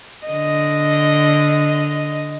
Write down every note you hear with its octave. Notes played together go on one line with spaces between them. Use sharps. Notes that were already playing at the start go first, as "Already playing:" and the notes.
D3 D#5